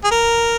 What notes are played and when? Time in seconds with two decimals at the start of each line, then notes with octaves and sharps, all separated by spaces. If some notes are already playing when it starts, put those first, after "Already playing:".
0.04 G#4
0.11 A#4